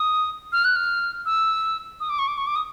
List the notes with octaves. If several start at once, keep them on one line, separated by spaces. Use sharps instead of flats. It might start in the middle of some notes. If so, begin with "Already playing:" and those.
Already playing: D#6
F6
F#6
F6
E6
D#6
D6
C#6
D6
C#6
D6
D#6